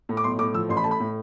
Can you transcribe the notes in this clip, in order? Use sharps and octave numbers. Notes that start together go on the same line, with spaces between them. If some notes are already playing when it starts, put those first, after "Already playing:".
A2
D6
B1 C6
A2 D6
F3 E6
A1 C6
B5
A3 A5
B5
A2